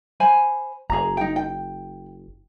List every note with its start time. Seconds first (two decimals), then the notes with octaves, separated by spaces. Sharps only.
0.20 C5 G#5 B5
0.90 F#1 G#4 A#5
1.17 D#4 G5
1.36 G5